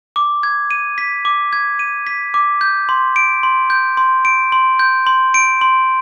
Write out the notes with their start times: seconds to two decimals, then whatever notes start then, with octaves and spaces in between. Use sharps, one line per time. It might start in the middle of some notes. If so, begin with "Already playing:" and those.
0.16 D6
0.43 G#6
0.71 D#7
0.98 B6
1.25 D6
1.53 G#6
1.79 D#7
2.07 B6
2.34 D6
2.61 G6
2.89 C6
3.16 D7
3.43 C6
3.70 G6
3.97 C6
4.25 D7
4.52 C6
4.79 G6
5.07 C6
5.34 D7
5.61 C6